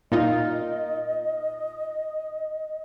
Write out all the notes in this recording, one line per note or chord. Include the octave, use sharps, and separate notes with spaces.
A#2 D#4 F4 A#4 D#5